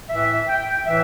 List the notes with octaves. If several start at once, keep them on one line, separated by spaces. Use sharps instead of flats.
A2 E3 E5
G5
A2 E3 E5